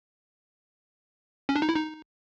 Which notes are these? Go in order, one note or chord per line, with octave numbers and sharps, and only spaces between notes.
C#4
D4
D#4
E4
D#4